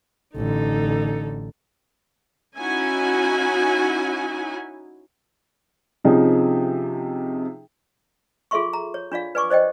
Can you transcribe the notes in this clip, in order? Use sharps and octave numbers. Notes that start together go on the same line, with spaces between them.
A1 D3 D#4 A4
C#4 D#4 E4 F#4 G#5
C3 F3 C#4 D#4 G#4
F4 G#4 A4 E5 C6 C#6
A#5
C#5
D4 F4 D5 F5
B4 D5 G#5 C#6 D6
C5 D5 D#5 G5